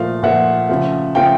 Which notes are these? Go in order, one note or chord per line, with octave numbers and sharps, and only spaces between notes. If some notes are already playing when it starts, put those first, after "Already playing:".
Already playing: A#2 F3 A3 F5
A#2 F3 A3 E5 F#5
C#3 F3 A3
C#3 F3 A3 F5 G5